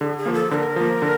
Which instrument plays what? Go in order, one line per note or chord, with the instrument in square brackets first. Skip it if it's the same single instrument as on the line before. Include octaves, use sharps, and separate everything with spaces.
[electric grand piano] D3 [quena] G#4
[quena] G#4
[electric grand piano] F3 A#3
[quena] A4
[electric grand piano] D3 [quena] A#4 C5
[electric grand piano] F3 A#3
D3